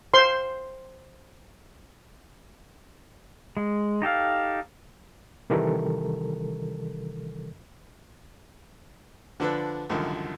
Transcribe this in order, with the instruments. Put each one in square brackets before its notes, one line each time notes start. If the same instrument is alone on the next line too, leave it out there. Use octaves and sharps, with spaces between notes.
[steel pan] C5 C6
[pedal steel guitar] G#3
D#4 G4 A4 F5
[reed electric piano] C3 D#3 E3 G3 A4 A#4
[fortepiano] D3 F3 D4 A4 B4
C2 F#2 D3 D#3 F3